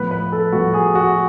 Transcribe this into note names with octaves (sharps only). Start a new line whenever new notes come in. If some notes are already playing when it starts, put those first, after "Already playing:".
Already playing: A2 F3 B3 B4
B4
A4
A2 F3 B3 F#4
G#4
F#4